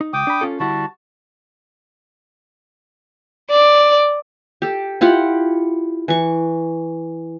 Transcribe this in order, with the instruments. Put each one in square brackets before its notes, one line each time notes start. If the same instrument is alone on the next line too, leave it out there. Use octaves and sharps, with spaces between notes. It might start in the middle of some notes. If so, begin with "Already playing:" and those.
[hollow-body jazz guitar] D#4
[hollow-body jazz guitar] C#2 [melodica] G5 D6 D#6
[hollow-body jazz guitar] D4 B5
C#4 F4 A4
[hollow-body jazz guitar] D3 G3 E4 [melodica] F#4 A5
[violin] D5
[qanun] G4 A4
E4 F4 G4 F#5
E3 C#6